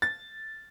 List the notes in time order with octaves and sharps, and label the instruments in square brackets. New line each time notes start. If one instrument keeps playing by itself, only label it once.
[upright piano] A6